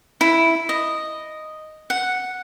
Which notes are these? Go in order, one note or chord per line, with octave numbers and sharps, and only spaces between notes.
E4
D#5
F#5